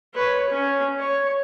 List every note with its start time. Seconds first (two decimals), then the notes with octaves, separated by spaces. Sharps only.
0.14 B4 C#5
0.49 C#4
0.99 C#5